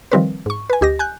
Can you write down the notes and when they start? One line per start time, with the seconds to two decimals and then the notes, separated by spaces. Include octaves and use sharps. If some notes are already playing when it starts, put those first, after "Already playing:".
0.12 D#3 F3 G3 C4 A#4 B4
0.46 G#2 C#6
0.70 B4 G#5
0.81 D2 G4 D#5 A#6
0.99 G#5 F#6 G6